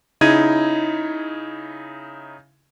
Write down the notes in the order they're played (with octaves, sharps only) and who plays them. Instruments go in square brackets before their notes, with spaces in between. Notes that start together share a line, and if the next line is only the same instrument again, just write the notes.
[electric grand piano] C#3 D#4 E4 G#6 D#7